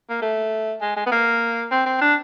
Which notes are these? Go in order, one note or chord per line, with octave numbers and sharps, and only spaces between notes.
A#3
A3
G#3
G#3
B3
A#3
C4
C4
D4